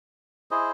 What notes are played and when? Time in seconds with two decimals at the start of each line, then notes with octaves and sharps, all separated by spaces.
0.51 E4 G#4 C5 D#5